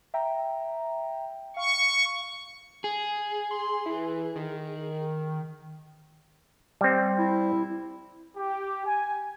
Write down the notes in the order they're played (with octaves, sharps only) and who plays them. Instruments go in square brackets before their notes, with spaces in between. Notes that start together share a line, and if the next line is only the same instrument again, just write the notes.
[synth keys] E5 G5 A#5
[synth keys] F5 [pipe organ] C#6
[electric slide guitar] G#4
[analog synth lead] C6
E3
D#3
[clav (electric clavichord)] G3 C4
[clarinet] E4
[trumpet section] G4
G#5